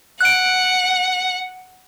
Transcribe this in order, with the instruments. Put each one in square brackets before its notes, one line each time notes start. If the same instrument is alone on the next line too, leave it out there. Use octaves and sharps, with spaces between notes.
[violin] F#5 [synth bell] F#6 D7